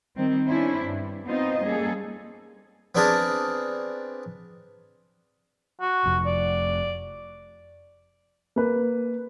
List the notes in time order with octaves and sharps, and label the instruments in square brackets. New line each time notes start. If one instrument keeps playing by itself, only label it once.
[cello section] D#3 G3 C4
C#4 D4 E4 C5
G2
B3 C4 D#4 F4 C5 D#5
G3 A#3 C#4 G#4 A4
[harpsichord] B3 C4 D4 G#4 A#4 A5
[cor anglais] F#4
[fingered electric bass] F1 F2
[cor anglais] D5
[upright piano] A#3 B4